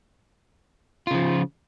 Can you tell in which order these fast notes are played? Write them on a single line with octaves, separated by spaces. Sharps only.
F4 C#3 F3